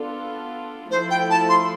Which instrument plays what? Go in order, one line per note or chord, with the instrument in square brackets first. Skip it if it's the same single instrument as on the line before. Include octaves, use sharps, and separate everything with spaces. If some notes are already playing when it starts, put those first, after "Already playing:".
Already playing: [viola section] B3 D4 F4 A4
[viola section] F3 A3 E4 A4 [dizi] C5
[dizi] G5
A5
C6